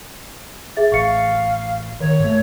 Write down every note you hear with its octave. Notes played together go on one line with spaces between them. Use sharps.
G#4 E5 A6
A1 F5 C#6 A6 C#7
D#3 A#4 C#5
G#2 A3